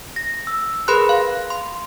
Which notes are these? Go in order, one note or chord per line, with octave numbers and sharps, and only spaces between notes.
A#6
E6
G#4 A#4 B4 B5 C6 F#6
F5
C6